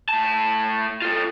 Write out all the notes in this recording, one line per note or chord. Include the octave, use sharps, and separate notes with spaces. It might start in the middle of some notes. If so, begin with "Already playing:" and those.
A2 A5
F4 A4